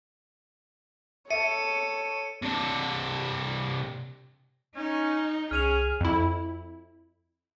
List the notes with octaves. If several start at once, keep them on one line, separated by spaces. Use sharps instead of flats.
A4 C#5 E5 C#7 D#7
C3 D4
C#4 D#4
C2 C#4 G#4 F6 D#7 F7
F2 E4